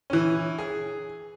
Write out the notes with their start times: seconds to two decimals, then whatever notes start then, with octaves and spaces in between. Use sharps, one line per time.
0.10 E3 C#4
0.58 G#4